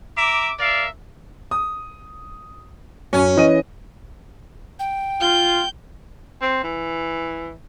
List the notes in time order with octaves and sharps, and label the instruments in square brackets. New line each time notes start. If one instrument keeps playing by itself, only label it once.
[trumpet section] E5 A#5 D6
A#4 D5 E5 F5
[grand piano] D#6
[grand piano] F#2 [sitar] C#4
[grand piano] E3 D#5 D#7
[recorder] G5
[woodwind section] F4 [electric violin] G6
[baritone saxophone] C4
E3